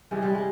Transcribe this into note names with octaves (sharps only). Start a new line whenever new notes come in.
C3 E3 G3 G#3
G3
G#3